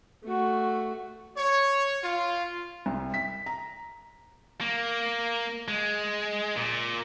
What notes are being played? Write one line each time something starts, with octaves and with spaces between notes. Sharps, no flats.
A3 F#4
C#5
F4
C2
B6
A#5
A#3
G#3
A#2